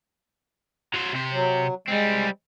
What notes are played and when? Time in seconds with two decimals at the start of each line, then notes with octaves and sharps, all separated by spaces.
0.94 F#3 C5
1.13 C3 C5
1.31 F#3
1.88 G3 G#3 C4